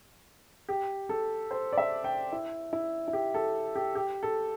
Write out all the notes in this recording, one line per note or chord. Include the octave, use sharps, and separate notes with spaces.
G4
A4
C5
D5
E5
G5
E4
E4
E4
G4
A4
G4
G4
A4